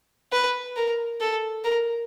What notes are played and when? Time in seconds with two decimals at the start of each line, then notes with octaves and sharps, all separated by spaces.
0.33 B4
0.77 A#4
1.21 A4
1.65 A#4